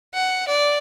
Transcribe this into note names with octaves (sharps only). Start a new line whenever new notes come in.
F#5
D5